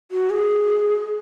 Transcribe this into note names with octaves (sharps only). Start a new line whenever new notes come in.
F#4
G#4